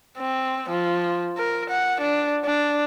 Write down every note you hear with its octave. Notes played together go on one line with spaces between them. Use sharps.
C4
F3
A#4
F#5
D4
D4